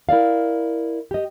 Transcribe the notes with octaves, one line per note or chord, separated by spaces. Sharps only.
E4 A#4 D5 F5
G4 D#5